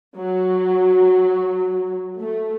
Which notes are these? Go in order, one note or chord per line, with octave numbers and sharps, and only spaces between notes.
F#3
A3